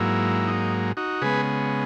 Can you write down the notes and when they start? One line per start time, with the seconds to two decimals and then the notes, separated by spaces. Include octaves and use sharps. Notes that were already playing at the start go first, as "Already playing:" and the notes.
Already playing: G#2 F#3 A#3 E4
0.47 D#4
0.97 D#4 F#4
1.22 C#3 G#3 B3 G#4 B4